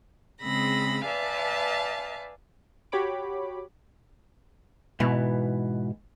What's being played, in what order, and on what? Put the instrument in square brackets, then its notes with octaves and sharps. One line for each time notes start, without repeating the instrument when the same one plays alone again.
[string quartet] C#3 G#3 C4 B5 E6 A#6
B4 D5 E5 F5 G#5 A5
[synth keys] F#4 G4 C#5 B5 D6
[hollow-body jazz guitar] G#2 E3 B3 [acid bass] B2